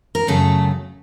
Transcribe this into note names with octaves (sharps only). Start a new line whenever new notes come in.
A#4
F#2 C#3 F#3 A3 A4